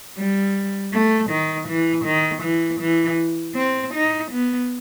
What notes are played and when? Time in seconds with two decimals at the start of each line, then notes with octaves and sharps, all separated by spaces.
0.18 G3
0.94 A3
1.31 D#3
1.68 E3
2.06 D#3
2.44 E3
2.82 E3
3.57 C4
3.94 D#4
4.31 B3